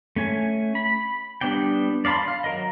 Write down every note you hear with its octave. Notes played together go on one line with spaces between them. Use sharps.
A3 C#4 G#5
B5
G3 B3 D4 D5 G5
D5 F5 A5 B5 C6
F5
F#3 A#4 D#5